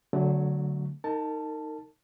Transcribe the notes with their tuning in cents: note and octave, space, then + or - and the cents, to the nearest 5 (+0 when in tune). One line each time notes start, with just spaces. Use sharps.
D3 -25 F#3 +0 A3 +0
D#4 +0 A#4 -35 A5 +0